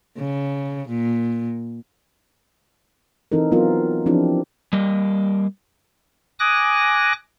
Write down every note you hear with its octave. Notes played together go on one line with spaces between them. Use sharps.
C#3
A#2
E3 C4 D#4 A4 A#4
F#3 B3 C4 F4 A#4
F3 C4 D4 E4 G4
G3 A#3 D#5
G#5 D6 D#6 F#6 A#6